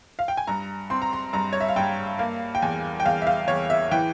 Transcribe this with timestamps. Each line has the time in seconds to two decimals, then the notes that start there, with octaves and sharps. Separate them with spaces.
0.19 F5
0.28 G5
0.37 G#5
0.47 G2 A#5
0.90 C4 C6
1.02 A#5
1.13 C6
1.33 G2 A#5
1.53 C#5
1.60 E5
1.68 F5
1.76 G2 G5
2.19 A#3 F5
2.55 G5
2.62 E2 G#5
3.00 G5
3.06 E2 F5
3.22 E5
3.27 F5
3.48 E2 C#5
3.70 E5
3.91 E3 G5